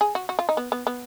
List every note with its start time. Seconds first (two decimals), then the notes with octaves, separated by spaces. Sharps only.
0.01 G#4
0.15 F#4
0.29 F#4
0.39 F4
0.49 D#4
0.57 B3
0.72 B3
0.87 B3